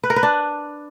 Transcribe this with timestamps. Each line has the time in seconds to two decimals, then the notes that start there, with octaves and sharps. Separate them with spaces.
0.04 B4
0.10 A#4
0.16 B4
0.23 D4